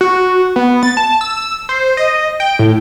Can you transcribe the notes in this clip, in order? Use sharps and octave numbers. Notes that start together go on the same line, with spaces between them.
F#4
B3
A6
A5
E6
C5
D#5
G5
A2